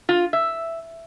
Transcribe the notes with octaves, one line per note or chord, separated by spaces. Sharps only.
F4
E5